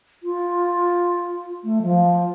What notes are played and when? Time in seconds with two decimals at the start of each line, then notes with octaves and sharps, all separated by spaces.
0.23 F4
1.64 A3
1.82 F3